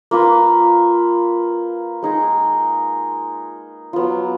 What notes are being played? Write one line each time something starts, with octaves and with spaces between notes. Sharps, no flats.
A#3 F4 B4
G#3 D#4 G#4
F#3 B3 F4